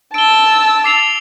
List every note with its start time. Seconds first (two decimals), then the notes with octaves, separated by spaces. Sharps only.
0.14 A5 E6 D7 G7
0.84 D6 C7 F7